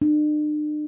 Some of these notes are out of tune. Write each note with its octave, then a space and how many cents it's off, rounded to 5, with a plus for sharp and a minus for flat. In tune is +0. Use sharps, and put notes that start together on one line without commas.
D4 +45